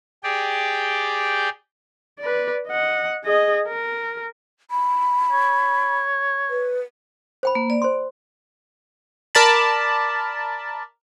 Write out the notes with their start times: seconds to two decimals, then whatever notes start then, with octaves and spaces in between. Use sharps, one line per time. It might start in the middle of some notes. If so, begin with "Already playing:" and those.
0.23 G4 G#4 D5 G5
2.20 B4 D5
2.68 D#5 F#5
3.24 G#4 D#5
3.69 A#4
4.71 B5
5.32 C#5
6.50 B4
7.43 C5 G5 B5
7.55 A#3
7.70 D5
7.82 C5 C6
9.35 A#4 D5 A5 B5